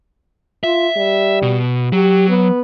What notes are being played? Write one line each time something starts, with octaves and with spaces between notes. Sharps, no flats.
F4 E5
G3
B2
F#3 G4
B3